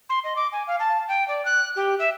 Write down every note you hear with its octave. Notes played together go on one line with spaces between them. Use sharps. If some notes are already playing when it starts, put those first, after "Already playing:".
C6
D#5
D6
G#5
F5
A5
G5
D5
F#6
G4
E5